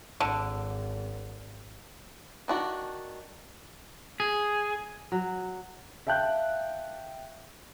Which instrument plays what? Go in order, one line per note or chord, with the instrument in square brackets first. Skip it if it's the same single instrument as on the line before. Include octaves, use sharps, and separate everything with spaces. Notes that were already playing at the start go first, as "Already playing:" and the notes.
[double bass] G#1 [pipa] D3
[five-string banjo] D#3 D4 F#4
[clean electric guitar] G#4
[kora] F#3
[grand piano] E5 F5 G5 A5 F#6 G6